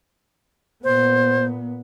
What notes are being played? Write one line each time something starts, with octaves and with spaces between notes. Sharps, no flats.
A#2 B3 C5